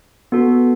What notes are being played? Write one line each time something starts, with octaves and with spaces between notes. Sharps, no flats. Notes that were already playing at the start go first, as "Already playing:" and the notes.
B3 F#4 A4